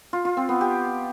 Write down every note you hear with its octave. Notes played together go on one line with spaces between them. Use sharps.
F4
F4
C4
B3
G4